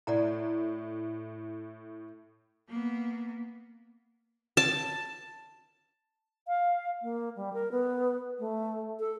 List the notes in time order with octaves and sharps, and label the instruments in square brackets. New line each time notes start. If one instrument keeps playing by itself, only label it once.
[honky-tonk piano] A2 [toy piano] D5 F#5 A#5
[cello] A#3 B3
[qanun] A5
[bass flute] F5
A#3
G3
A#4
B3
A3
A4